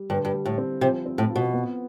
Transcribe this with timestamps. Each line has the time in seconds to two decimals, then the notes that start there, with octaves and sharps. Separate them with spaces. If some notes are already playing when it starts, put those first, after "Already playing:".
Already playing: G3
0.10 G2 D3
0.25 G2
0.33 G3
0.45 A2
0.58 C4
0.81 C3 F3
1.06 C4
1.18 A2
1.30 F4
1.36 B2
1.53 B3